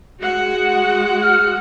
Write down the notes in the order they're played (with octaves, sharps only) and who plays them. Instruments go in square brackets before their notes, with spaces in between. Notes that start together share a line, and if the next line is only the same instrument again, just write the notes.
[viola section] G#3 F#4 F#5
[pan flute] F6